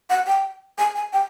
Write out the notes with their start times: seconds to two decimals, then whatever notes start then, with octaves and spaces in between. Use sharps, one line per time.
0.10 F#5
0.27 G5
0.78 G#5
0.95 G#5
1.13 G5